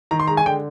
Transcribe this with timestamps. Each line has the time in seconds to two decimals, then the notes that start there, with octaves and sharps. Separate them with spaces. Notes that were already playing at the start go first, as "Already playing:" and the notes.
0.11 D#3 A#5
0.20 C6
0.27 G#3 A#5
0.37 G#5
0.46 D3 G5